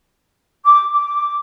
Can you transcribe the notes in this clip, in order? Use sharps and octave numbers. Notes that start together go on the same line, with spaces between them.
D6
D6